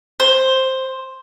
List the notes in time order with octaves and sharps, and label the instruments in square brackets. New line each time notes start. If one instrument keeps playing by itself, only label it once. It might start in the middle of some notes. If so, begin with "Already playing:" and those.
[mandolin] C5